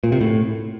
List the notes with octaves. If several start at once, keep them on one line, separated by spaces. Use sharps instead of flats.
A#2
C3
A2